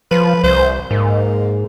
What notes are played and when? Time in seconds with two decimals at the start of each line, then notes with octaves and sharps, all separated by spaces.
0.11 F3 B4
0.44 C2 C5
0.91 G#2 A#3